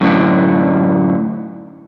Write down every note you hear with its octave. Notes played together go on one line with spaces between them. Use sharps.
F#2 A2 D3